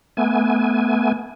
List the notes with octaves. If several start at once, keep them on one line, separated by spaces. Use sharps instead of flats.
A3 B3 G#5